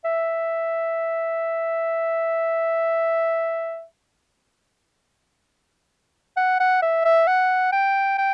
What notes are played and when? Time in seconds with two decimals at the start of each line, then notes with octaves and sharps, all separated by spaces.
0.05 E5
6.37 F#5
6.60 F#5
6.82 E5
7.05 E5
7.27 F#5
7.72 G5
8.18 G5